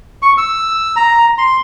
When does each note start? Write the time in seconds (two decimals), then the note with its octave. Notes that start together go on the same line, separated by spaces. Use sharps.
0.22 C#6
0.38 E6
0.96 A#5
1.38 C6